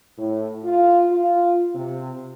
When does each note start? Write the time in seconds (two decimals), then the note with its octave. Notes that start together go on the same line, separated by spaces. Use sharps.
0.17 A2
0.63 F4
1.10 F4
1.74 C3